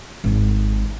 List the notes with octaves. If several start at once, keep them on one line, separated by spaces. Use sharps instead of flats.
G#1